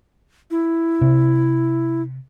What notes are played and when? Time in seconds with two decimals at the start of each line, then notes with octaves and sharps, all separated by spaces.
0.51 E4
1.01 C3